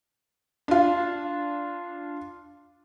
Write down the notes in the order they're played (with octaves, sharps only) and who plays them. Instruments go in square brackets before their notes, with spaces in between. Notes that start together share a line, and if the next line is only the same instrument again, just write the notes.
[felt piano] D4 F4